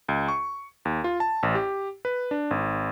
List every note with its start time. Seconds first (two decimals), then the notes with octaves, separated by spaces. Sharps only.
0.09 C#2
0.28 C#6
0.85 D#2
1.04 F4
1.20 A5
1.43 A1
1.55 G4
2.05 B4
2.31 D4
2.51 G#1